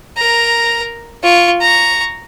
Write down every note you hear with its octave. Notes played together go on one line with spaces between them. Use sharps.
A#4 A#5
F4 C#6
A#5 C#6